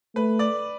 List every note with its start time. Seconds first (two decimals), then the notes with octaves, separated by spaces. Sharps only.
0.15 A3 B4
0.39 D5